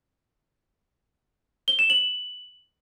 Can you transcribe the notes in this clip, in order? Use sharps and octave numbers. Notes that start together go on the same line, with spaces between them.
G7
E7
F#7